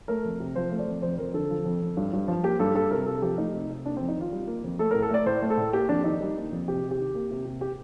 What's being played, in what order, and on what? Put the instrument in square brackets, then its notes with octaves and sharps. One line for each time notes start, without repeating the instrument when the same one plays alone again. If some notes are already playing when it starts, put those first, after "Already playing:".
[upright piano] A3 A#4
F2
C3
F3 C5
A3
D5
F2
F2 C5
F2 A#4
D3 A4
F3
F2
F2
G2
G2
F3
A#3 G4
G2 A4
G2 A4
C3 A#4
C3 A4
F3 G4
A3 D#4
C3
C3
A#3 D4
C4
F2
D#4
D#3 F4
G3
A#3
F2
A3 A4
A#4
A2
A4
A3 D5
A2 C5
A3
A4
A2
A#3 G4
F2 D4
D#3 D#4
G3
A#3
F2
C3 G4
C3
G4
D#3
A#3
C3
C3
G4